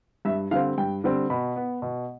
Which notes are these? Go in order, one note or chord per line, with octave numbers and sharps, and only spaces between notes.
G2 E5
D3 G3 C4 F5
G2 G5
D3 G3 C4
B2 B5
B3
B2